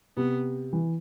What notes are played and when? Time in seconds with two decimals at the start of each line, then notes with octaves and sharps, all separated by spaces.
0.17 C3 B3
0.73 E3